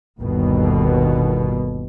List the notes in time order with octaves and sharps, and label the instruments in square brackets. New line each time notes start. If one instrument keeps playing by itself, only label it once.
[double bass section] G1 D#2 B2